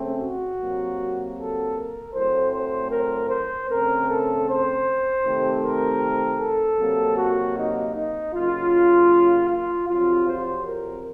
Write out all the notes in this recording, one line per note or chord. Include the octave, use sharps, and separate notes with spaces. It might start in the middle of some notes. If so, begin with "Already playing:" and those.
Already playing: C#3 A3 C4
F#4
C3 F#3 A#3
A4
A#4
A2 F#3 A3 C4 C5
C5
A#4
C5
C#3 A3 C4 A#4
A4
C5
C3 D#3 A3 C4
A#4
A4
C3 F#3 A#3
F#4
D#4
D#4
C#3 F#3 A#3 F4
F4
F2 C3 F#3 F4
C5
A#4